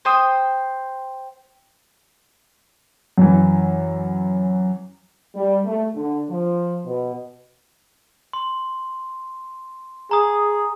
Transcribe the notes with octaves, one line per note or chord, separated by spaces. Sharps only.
C5 G5 D#6
F#2 E3
G3
A3
D3
F3
B2
C6
G#4 A#5 D#6